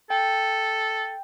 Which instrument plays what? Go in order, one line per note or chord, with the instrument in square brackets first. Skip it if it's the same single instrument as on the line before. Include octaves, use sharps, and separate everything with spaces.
[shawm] A4 [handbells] G5